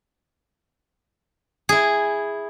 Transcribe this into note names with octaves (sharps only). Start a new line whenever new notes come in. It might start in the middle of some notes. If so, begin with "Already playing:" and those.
E4 G#4